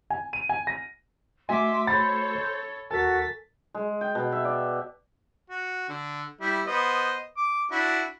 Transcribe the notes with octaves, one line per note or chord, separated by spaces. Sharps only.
G#5
D#7
G#5
A#6
A3 F#4 D#5 E5 G#5 C6 D6
A4 C5 C#5 B5 A6
D#2 F#4 A4 A#4 G#5 A6 B6
G#3
G5
B2
E5
D5
F#4
D3
G3 E4
B3 C5 D#5
D6
D4 E4 F#4